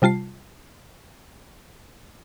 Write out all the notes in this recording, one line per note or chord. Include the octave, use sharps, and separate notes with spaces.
C3 G3 F4 A5 C7